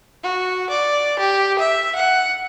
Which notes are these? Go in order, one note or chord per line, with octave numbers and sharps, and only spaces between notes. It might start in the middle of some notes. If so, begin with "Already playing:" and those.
F#4
D5
G4
E5
F#5